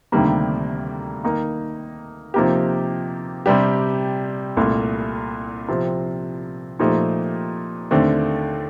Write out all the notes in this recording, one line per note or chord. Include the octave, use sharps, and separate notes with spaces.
D2 C3 D#3 G3 A#3
D#3 A#3 D#4 A#4
C3 F3 A#3 D#4 G4
C3 G3 D4 G4
C2 A#2 A3
C3 F3 C4
A#2 F3 A3 D#4 G4
D#2 D3 A3 C4